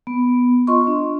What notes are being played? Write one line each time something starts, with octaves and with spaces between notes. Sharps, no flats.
B3
F4 D#5 C6 C#6
D4